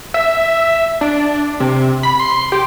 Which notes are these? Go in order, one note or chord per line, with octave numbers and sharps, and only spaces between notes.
E5
D4
C3
B5
C6
G4